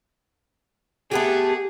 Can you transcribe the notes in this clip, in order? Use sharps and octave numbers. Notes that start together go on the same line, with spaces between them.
A3 B3 G4 G#4